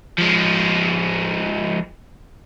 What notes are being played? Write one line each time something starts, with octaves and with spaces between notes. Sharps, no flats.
F3 G#3